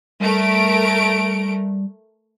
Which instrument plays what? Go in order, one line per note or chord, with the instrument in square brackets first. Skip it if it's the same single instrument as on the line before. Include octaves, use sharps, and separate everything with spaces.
[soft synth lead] G3 [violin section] A3 A#4 D7